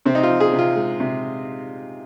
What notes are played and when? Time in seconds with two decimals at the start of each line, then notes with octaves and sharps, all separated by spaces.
0.05 C3 C4
0.15 D#4
0.23 F4
0.29 F3
0.40 G#4
0.53 C3
0.59 F4
0.76 G#3
1.00 C3